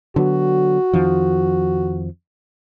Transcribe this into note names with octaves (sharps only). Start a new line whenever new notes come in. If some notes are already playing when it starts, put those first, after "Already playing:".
D3 F#3 B3 F#4
F2 D#3 F3